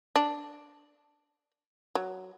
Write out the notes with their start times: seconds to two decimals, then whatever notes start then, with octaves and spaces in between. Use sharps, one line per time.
0.16 D4
1.95 F#3